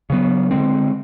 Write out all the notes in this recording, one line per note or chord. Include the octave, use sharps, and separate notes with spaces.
C#3 F#3 B3
D3 F3 G#3 C4